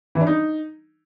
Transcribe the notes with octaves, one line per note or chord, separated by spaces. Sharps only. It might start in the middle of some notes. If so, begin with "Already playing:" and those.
E3
D4
D#4